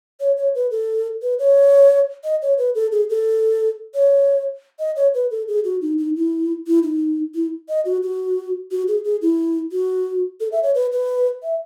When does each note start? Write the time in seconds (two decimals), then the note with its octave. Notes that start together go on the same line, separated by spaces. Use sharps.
0.20 C#5
0.37 C#5
0.55 B4
0.71 A4
1.22 B4
1.39 C#5
2.24 D#5
2.42 C#5
2.58 B4
2.75 A4
2.92 G#4
3.10 A4
3.95 C#5
4.79 D#5
4.96 C#5
5.14 B4
5.31 A4
5.48 G#4
5.65 F#4
5.82 D#4
5.98 D#4
6.16 E4
6.67 E4
6.83 D#4
7.35 E4
7.69 D#5
7.85 F#4
8.03 F#4
8.71 F#4
8.88 G#4
9.04 G#4
9.22 E4
9.72 F#4
10.40 A4
10.52 E5
10.63 C#5
10.75 B4
10.92 B4
11.43 E5